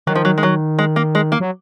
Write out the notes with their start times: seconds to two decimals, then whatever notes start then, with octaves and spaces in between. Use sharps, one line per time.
0.07 D#3 F#3
0.16 F3
0.25 F#3
0.38 G#3
0.43 F#3
0.79 G#3
0.96 A#3
1.15 G#3
1.32 A#3
1.40 F#3